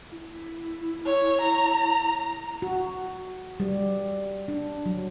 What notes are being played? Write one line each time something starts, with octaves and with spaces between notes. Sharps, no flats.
E4
C#5
A#5
F#4
G3
D4
F#3